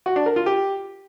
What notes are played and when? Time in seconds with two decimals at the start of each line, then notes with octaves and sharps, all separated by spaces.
0.06 F#4
0.16 D4
0.26 A#4
0.36 F4
0.46 G4